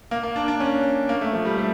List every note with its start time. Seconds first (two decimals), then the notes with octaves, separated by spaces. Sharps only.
0.11 A#3
0.23 A#3
0.36 D4
0.48 D4
0.60 C#4
1.09 A#3
1.21 A3
1.33 F3
1.45 G3
1.58 A3